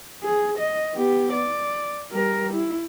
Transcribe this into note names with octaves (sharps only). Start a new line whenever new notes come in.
G#4
D#5
B3 G4
D5
G3 A#4
E4